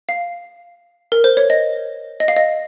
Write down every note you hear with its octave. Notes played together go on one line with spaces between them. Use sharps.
F5
A#4
C5
C#5
D#5
D#5
F5
D#5